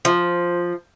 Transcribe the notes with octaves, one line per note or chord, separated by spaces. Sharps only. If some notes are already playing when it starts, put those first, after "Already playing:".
F3